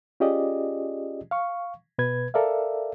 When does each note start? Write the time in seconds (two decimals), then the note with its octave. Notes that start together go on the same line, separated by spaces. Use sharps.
0.20 C#4 F4 G4 G#4 D5 D#5
1.31 F5 C#6
1.98 B2 B4 G#6
2.34 A4 A#4 D5 E5 F5